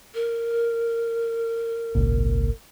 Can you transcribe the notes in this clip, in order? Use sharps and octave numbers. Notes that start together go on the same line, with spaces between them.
A#4
G#1 C#2 A#2